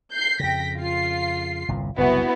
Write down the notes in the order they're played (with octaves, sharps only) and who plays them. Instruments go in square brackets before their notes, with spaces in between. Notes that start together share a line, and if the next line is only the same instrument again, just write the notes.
[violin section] G6 C7
[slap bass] F2 C#3 [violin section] G5 A#6 B6
[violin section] F4 C7
[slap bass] G1 C2 A#2
[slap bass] F#1 C2 [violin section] B3 E4 F#4